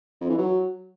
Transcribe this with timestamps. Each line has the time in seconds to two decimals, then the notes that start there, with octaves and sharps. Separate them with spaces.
0.21 F2
0.30 E3
0.38 F#3